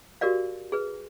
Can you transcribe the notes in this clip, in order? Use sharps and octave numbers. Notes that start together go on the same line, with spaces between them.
F#4 G4 A#4 D5 F5
G#4 B4